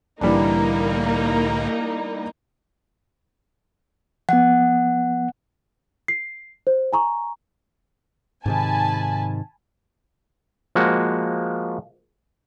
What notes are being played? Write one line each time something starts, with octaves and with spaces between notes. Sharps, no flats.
C2 A2 D3 E3 G3 A#3 D4 D#4
F3 B3 F#5
C7
C5
G#5 A#5 C#6
G#2 C3 D#3 G#5 A5 B5
F3 G#3 A#3 F#4